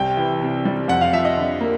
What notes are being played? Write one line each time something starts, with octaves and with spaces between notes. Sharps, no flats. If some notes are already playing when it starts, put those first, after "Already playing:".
Already playing: C2 G5
E3
C3
G3
F2 F#5
F5
F3 E5
D#5
D3
A#3